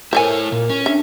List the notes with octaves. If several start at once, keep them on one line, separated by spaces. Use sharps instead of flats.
E4 A4 A#4 C5 C#5 E5 G#5
A#2 A#4
C#4
D4 E5